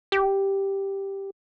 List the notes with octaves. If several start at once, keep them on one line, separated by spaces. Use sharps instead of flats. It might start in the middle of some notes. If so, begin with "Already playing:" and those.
G4